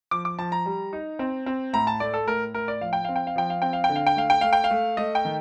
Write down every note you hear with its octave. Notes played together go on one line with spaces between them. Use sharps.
F3 D6
D6
F3 A5
A#5
G3
D#4
C4
C4
A2 A#5
A5
A3 D5
A4
A2 A#4
A2 A#4
D5
F3 F5
G5
C4 F5
G5
F5
F3 G5
F5
C4 G5
F5
G5
D3
F5
G5
A3 F5
G5
A3 F5
G5
F5
A3
A3 D#5
G5
D#3